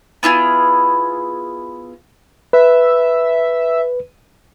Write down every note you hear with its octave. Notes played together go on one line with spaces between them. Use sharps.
B3 E4 F4 G#4
B4 E5